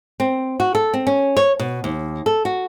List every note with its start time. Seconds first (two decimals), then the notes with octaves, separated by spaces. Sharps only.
0.20 C4
0.60 F#4
0.75 A4
0.94 C4
1.07 C#4
1.37 C#5
1.59 B2
1.84 D#2
2.26 A4
2.45 F#4